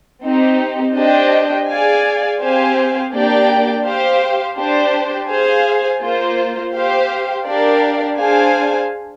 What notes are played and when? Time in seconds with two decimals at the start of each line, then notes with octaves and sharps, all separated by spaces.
0.24 C4 D#4 G4
0.96 D4 G4 C5 D#5 G5
1.68 G#4 D5 F5 G#5
2.40 C4 G4 C5 F5 G#5
3.13 A#3 D4 G4 D5 G5
3.85 G4 C5 F5
4.57 D4 G4 C5
5.29 G#4 C5 F5 G#5
6.01 A#3 F4 C5
6.74 G4 C5 F5
7.46 D4 G4 A#4 D5 F5
8.18 D4 G#4 C5 F5 G#5